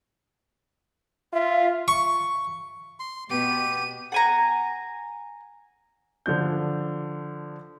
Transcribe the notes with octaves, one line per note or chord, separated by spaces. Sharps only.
F4 E5
C#6
C6
B2 B3 G4 D#7
F#5 G#5 A#5
D3 F3 D4 G6